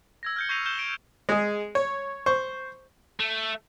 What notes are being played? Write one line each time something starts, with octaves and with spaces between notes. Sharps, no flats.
E6 G#6 A#6
F6 G6 C#7
C#6 G6 A#6 C7 D#7 F7
F6 G6 D#7 E7 G7
A#6 D7
G#3 G#4
C#5
C5 C#6
A3